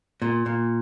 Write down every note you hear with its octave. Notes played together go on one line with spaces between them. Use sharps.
A#2
A#2